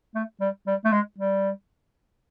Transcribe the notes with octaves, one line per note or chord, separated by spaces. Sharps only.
A3
G3
G3
A3
G#3
G3